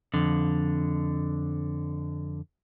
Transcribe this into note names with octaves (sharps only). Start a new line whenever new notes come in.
F2 D3